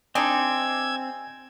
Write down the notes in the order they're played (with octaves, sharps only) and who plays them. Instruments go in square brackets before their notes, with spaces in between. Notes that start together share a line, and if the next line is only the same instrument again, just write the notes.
[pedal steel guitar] C4 [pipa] D4 D#4 G4 [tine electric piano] G#5 [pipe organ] E6 G#6